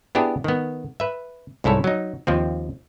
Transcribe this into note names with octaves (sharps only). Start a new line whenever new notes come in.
B3 D4 E4 G4 G#4
D#3 B3
B4 E5
C2 G#2 E4 A4 C#5
F#3 D#4
D#2 F3 C4